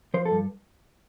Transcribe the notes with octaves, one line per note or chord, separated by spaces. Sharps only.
F3 C5
A4
G2